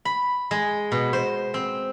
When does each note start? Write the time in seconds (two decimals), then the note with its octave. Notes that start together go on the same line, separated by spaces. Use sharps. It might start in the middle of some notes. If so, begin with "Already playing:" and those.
0.05 B5
0.51 G#3
0.92 B2
1.13 C5
1.54 C4